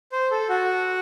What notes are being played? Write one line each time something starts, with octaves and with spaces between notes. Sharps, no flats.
C5
A4
F#4